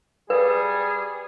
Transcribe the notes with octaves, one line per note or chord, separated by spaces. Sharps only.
G3 G#4 B4